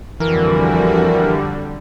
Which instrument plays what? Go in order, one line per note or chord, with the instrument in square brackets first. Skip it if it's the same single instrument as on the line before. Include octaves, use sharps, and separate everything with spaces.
[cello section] F2 F3 F#4 [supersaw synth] D3 G3 [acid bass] E3 [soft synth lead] A#4